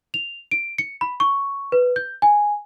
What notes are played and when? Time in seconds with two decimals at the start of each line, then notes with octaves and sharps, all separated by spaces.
0.14 F7
0.51 D7
0.78 C#7
1.01 B5
1.20 C#6
1.72 B4
1.96 G6
2.22 G#5